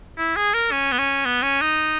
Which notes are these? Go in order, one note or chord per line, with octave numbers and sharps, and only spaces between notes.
E4
G#4
A#4
C#4
B3
C#4
B3
C#4
D#4